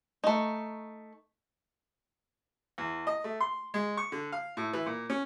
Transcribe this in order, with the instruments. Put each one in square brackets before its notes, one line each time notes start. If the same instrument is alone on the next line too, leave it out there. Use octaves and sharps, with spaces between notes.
[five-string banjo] A3 D#4
[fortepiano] E2
D#5
A3
C6
G#3
C#6
D3
F5
A2
E3
A#2
C#4